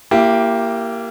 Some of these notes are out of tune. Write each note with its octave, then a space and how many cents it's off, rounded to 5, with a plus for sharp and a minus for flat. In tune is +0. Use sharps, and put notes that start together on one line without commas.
A#3 +0 E4 +35 G4 +0